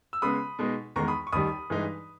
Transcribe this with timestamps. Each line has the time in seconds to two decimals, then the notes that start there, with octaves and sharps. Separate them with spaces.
0.13 E6
0.22 C#3 G#3 B3 B5 D#6
0.59 B2 G#3 D#4
0.96 E2 D#3 G#3 A#5 C#6
1.08 B5 D#6
1.27 C#6
1.32 D#2 D#3 G3 B5 D#6
1.70 G2 E3 G#3 D#4